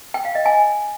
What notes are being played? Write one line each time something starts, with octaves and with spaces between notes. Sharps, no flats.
G5
F5
D#5
G#5